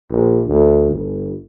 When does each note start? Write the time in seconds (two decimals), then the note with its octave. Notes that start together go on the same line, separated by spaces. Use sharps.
0.10 A#1
0.47 D2
0.91 G1